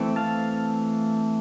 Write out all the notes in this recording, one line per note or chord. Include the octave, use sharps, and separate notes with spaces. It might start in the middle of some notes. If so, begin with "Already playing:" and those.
Already playing: E3 A3 C4
F5 A5